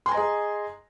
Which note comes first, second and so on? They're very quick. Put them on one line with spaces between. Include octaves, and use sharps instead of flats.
C6 G#5 A#5 D#5 G#4